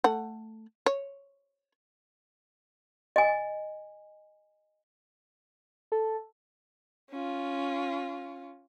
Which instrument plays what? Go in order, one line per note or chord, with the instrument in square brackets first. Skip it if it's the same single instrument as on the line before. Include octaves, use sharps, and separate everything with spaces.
[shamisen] A3 F#5
C#5
[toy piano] D#5 G#5
[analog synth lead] A4
[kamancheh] C#4 F4